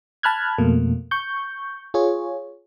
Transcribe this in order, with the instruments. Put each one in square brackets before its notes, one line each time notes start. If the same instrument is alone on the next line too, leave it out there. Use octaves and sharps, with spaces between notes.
[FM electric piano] A5 B5 F6 F#6 G#6
F2 B2 A3 A#3
C#6 G6
F4 G#4 C#5